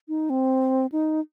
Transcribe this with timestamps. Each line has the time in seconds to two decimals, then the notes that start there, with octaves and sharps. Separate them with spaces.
0.08 D#4
0.30 C4
0.92 D#4